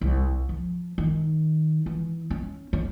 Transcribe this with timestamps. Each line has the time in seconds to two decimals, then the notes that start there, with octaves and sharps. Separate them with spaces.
0.01 C2
0.49 F3
0.98 D#3
1.86 E3
2.31 C#4
2.73 C#4